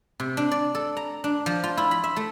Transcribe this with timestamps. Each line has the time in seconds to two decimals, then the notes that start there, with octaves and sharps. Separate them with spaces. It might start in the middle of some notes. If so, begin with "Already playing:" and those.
0.20 C3
0.37 D4
0.51 D5
0.75 A4
0.97 A#5
1.24 D4
1.46 F3
1.64 F4
1.77 E4
1.91 B5
2.04 E5
2.16 A3